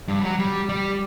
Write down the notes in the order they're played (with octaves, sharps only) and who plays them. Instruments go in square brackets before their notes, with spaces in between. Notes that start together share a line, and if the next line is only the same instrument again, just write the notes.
[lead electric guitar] G2
G3
F#3
G3
G3